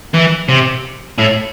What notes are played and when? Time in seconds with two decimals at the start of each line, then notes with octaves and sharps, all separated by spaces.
0.14 E3
0.49 C3
1.19 A2